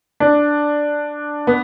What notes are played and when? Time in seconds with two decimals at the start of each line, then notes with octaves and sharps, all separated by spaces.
0.20 D4
1.47 B3